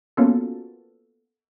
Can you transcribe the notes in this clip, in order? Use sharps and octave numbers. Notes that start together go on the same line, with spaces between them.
A#3 B3 C#4 F4 F#4 A4